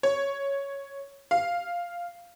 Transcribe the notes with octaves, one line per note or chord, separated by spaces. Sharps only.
C#5
F5